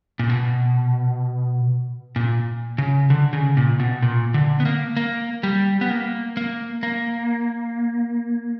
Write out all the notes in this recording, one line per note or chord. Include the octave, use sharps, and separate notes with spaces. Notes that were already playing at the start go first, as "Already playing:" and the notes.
A#2
B2
A#2
C#3
D3
C#3
A#2
B2
A#2
D3
B3
A#3
A#3
G3
B3
A#3
A#3
A#3